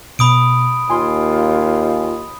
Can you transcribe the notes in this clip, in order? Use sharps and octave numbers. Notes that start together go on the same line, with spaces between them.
B2 B5 D#6 D7
D#2 F4 G#5 C6